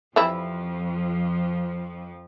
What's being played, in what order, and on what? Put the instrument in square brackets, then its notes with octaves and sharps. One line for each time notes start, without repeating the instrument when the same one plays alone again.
[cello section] F2 F3 [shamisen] E3 G3 E4